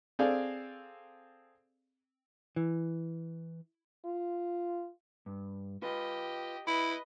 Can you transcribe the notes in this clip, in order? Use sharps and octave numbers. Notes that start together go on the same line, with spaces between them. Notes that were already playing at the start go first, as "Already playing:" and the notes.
C4 G#4 A4 D5 F5
E3
F4
G2
F4 G4 B4 D#5
E4 B4 D#5 B5